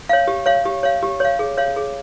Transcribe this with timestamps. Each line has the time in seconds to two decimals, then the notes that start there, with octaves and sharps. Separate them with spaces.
0.09 C#5 F5
0.27 G4
0.46 C#5 F5
0.65 G4
0.83 C#5 F5
1.03 G4
1.20 C#5 F5
1.39 G#4
1.57 C#5 F5
1.76 G#4